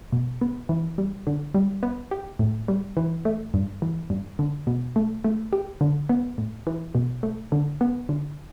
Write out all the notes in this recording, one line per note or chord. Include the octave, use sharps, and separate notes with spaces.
B2
B3
E3
G3
D3
G3
B3
G4
A2
G3
E3
A3
G2
E3
G2
D3
B2
A3
A3
G4
D3
B3
A2
E3
B2
A3
D3
B3
D3